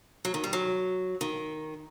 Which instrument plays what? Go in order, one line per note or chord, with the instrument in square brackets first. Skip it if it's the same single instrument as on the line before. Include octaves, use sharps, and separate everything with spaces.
[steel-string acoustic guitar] F#3
D#3
G3
F#3
D#3